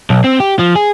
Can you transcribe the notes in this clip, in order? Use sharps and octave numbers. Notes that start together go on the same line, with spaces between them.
B1
C4
G4
F3
G#4